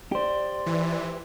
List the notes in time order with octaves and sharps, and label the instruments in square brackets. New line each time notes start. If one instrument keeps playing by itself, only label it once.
[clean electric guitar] G4 C5 [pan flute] D5
[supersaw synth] E3